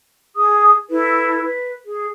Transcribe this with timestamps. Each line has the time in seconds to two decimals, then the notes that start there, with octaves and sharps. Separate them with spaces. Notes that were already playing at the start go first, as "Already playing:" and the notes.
0.34 G#4 D#6
0.90 E4 A4 B4
1.42 B4
1.85 G#4